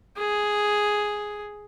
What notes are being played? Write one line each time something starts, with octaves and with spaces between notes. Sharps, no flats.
G#4